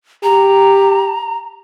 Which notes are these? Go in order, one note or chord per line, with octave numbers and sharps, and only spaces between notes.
G4 A#5